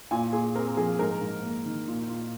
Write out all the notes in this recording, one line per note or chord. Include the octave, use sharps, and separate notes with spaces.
A#2 G#5
A#2 G#4
C4 A#4
F3 G#4
G#2 A#4
G#2
A#3
D#3
A#2
A#2